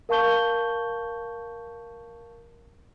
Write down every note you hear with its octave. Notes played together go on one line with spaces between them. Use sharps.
A#4 F5 A5 C#6 G6 G7